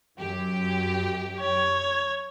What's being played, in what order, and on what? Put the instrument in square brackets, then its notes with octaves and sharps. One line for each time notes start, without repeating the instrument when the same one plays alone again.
[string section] F#2 G4
[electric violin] C#5